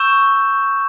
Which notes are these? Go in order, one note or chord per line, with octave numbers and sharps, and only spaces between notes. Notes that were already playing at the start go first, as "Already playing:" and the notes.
Already playing: C#6 E6 G6 E7